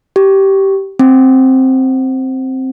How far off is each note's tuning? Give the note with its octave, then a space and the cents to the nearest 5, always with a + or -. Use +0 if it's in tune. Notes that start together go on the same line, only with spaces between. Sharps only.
G4 -15
C4 +5